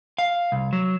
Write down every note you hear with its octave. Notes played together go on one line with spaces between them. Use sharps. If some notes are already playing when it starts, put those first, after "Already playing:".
F5
C2
F#3